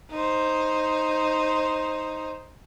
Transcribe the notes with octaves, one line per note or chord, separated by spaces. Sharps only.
D#4 C5